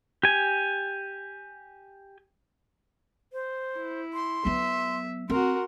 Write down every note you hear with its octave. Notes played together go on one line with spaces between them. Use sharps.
G4 G#5
C5
E4
C6
F#3 B3 E5
C4 F#4 A#4 C6